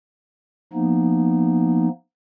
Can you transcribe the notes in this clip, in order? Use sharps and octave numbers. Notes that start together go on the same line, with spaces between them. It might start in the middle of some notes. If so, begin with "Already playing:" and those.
F3 A#3 B3 D#4